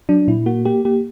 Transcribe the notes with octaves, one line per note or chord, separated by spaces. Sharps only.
F#3 D4
A#2 E4
A#3 F#4
A#3 G4
A#3 G4